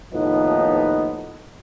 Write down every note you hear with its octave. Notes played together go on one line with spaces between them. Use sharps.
D#2 A2 F3 B3 D#4